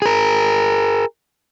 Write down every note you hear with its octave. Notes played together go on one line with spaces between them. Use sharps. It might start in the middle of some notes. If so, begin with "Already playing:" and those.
G#4 A#4